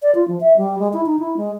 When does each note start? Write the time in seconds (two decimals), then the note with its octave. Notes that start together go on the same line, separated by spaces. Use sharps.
0.02 D5
0.15 F4
0.28 F3
0.40 E5
0.57 G3
0.79 G#3
0.93 E4
1.06 D#4
1.19 E4
1.37 G#3